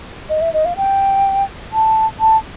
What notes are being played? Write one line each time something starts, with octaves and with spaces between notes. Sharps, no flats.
D#5
E5
D#5
F5
G5
A5
A5